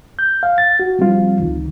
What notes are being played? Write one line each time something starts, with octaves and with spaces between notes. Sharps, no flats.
G6
F5
A6
F#4
F3 G3 C4 F4
C#2 D#3